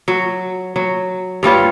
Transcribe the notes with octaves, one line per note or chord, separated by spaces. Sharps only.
F#3
F#3
G2 G3 F4 C#5